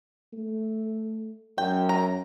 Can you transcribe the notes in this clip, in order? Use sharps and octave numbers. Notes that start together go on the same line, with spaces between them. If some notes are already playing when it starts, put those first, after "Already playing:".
A3
F#2 G5
A#5